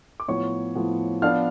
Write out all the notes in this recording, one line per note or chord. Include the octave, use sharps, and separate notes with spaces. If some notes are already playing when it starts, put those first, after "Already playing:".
D6
A2 F3 B3 C#5 C#6
A2 F3 B3
F3 B3 D4 F5 F6